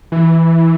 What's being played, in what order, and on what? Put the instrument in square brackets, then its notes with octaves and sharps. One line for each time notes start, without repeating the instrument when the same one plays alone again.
[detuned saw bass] E3